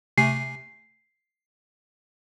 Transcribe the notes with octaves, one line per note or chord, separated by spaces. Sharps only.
C3 A3 G#5 C7